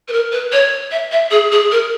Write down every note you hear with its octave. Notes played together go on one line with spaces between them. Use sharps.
B4
A#4
B4
C#5
E5
E5
G#4
G#4
A#4